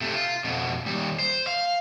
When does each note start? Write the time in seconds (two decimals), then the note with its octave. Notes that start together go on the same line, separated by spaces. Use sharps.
0.01 C3 A3
0.13 F4
0.44 F2 B2
0.86 D#2 G3
1.19 C5
1.47 F5